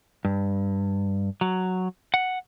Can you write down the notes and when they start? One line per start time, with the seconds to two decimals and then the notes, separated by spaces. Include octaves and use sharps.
0.25 G2
1.41 F#3
2.14 F#5